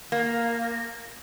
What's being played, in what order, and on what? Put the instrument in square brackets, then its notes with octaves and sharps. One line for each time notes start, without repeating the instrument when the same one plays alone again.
[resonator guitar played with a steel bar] A#3